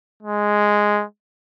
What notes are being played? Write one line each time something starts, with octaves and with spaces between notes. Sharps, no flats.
G#3